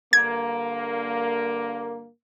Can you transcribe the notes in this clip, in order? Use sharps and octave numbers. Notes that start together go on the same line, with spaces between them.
G2 D3 A#3 G#6